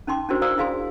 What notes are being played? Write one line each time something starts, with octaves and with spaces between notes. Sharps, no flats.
C#4 D#4 G5 C6 D6
C#4 D4 E4 F#4 A#4 C5
C5 D5 F5 A#5 D#6 E6
E4 G#4 F5 G#5 C6